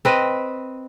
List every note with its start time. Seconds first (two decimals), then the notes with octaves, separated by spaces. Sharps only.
0.05 C4 B4 D#5